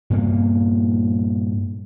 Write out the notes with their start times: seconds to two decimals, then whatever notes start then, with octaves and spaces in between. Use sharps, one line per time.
0.10 G2 A#2 A#3